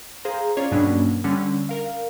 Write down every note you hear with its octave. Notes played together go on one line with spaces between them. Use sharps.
G#4 C5 F5 A#5
C#4 F4 C#5 D5
G2 B2 F#3 A#3 C#4 D4
D3 G3 C#4
A#4 F5